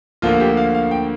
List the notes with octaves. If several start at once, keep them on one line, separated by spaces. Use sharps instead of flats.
D2 D3 F3 A#3 F4
G4
F5
F5
G5